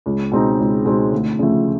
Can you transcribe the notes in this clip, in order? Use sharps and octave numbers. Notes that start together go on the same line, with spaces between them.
C#2
B2 G#3 C4 D#4
C#2
B2 G#3 C4 D#4
D2
C#3 F3 A3